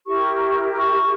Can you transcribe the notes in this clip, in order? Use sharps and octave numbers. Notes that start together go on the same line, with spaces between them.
E4 G4 A#4 C#6
C#6